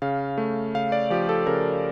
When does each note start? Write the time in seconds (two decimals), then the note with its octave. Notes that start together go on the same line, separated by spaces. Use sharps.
0.02 C#3 F5
0.38 A3
0.75 C#3 F5
0.92 D5
1.10 F3 G4
1.29 A4
1.47 C#3 A#4